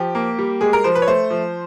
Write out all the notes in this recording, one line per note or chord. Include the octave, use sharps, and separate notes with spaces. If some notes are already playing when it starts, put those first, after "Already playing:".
Already playing: F3 G4
A#3
G3
G#3 G#4
A#4
F3 C5
B4
C#5
A3 C5
F3